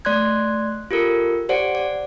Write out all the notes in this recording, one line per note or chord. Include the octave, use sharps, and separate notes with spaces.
A3 D5 C6 F#6 G#6
F4 G4 A4 A#4
G4 C5 D5 F#5 D7
D5